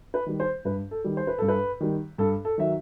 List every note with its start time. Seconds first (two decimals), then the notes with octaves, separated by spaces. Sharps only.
0.14 B4
0.26 D#3 G3
0.40 C5
0.65 G2 B4
0.91 A4
1.04 D#3 G3
1.17 C5
1.27 B4
1.38 G2 A4
1.48 B4
1.80 D#3 G3
2.18 G2 A4
2.45 A4
2.58 D#3 F#3 E5